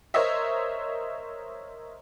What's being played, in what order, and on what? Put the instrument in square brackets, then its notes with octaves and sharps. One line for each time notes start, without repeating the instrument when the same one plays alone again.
[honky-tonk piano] A#4 C5 C#5 D#5 E5